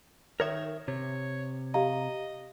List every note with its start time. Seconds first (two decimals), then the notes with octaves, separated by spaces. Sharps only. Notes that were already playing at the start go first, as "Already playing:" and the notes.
0.40 D#3 A#4 C#5 E5
0.88 C3 C#5
1.74 G4 D#5 F5 A#5